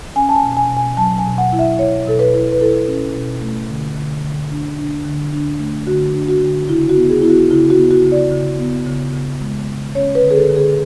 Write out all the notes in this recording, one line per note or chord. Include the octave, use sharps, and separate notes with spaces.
C#4 G#5
A5
G#5
B2
G#5
B2
G#5
F#3 A5
G#5
B2
F#5
E4
E5
E4 C#5
B2 A4
B4
E4
B4
E4 A4
C#4
B2
A3
D3
D3
D3
D4
D4
D3
D4
A3
D3 F#4
D4
F#4
D3
C#3 E4
F#4
B3
G#4
B3 E4
F#4
C#3 E4
F#4
B3
F#4
C#3
D5
C#3
B3
C#3
C#3
G#3
C#3
C#4 C#5
B4
D3
G#4
A4
D3
G#4